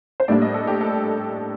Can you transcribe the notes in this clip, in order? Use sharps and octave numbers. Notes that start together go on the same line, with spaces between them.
C5
A2 G3 A#3 D4 D5
D#5
A4
G4
A4